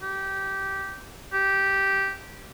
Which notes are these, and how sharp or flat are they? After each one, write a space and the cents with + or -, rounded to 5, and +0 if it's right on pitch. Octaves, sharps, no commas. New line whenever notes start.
G4 -15
G4 -10